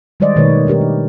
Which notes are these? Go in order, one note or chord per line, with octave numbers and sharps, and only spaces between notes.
D#3 G3 G#3 C5 D5 D#5
B2 D#3 A3 B4 C#5
D4 D#4 G4 A#4
D#3